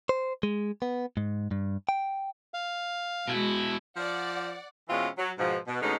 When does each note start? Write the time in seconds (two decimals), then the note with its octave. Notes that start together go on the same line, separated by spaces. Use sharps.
0.09 C5
0.43 G#3
0.82 B3
1.17 G#2
1.51 G2
1.89 G5
2.54 F5
3.28 B2 G#3 E4 F#4
3.96 F3 D5 F#5
4.89 B2 E3 G#3 C4 C#4 F4
5.18 F#3
5.38 G#2 B2 F3
5.67 B2
5.81 D2 D3 G#3 B3 C#4 D#4